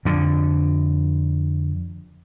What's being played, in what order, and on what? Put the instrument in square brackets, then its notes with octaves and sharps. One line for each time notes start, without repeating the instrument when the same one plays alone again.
[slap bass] F2 D3